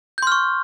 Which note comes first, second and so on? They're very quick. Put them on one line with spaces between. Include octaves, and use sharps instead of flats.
G6 C6 F6 C#6